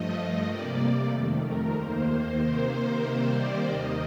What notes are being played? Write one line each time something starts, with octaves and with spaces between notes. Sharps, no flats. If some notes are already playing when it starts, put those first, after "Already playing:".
Already playing: G2 F3 A3 D#5
C3 G3 A#3 D5
F2 D#3 A3
A#4
D#2 D#3 A#3 C5
C3 D#3 A#3 C5
C5
C3 D#3 G3 A#3 C5
D5
D#2 D#3 A#3 D#5